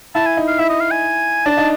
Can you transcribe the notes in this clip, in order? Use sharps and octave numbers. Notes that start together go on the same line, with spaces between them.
E4 A5
G#5
D#4
F5
E4 E5
D#5
F5
G#5
D4 A5
D#4